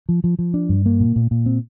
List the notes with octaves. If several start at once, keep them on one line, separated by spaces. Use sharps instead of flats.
F3
F3
F3
D4
G2
A#3
A#2
A#2
A#2
C4